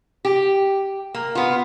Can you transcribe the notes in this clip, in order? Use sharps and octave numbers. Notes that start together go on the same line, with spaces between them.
G4
A#3
B3 F4